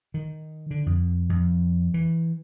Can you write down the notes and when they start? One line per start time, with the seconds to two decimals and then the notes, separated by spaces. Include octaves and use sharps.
0.14 D#3
0.71 D3
0.86 F2
1.29 F2
1.94 E3